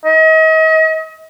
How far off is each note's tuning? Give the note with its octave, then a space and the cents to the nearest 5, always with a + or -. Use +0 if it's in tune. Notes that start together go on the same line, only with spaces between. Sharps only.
D#5 +35